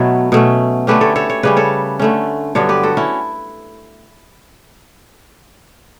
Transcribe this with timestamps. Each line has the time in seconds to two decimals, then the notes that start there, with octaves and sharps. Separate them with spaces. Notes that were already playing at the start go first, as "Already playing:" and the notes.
Already playing: B2 F#3 A3 A4 B4 C#5
0.32 B2 A3 C#4
0.87 D3 A3 C#4 G4 B4
1.01 A4 C#5
1.16 A4 C#5
1.30 C#5
1.43 C#3 G3 C#4 B4
1.57 A4 C#5
1.99 D3 A3 C#4
2.55 G2 D3 F#3 B3 A4 C#5
2.69 G4 B4
2.83 F#4 A4
2.97 C#4 E4